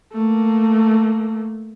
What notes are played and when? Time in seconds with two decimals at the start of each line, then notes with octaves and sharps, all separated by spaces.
0.13 A3 A#3